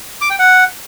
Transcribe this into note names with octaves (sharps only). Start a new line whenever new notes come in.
D6
G5
F#5